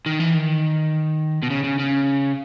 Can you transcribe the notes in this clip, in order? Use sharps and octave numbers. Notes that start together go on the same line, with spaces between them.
D#3
E3
D#3
B2
C#3
C#3
C#3